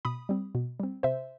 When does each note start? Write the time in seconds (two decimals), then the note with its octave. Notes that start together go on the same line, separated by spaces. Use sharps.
0.05 B2 B5 D#6
0.29 G3 C4
0.55 B2
0.80 G3 C4
1.03 C3 C5 E5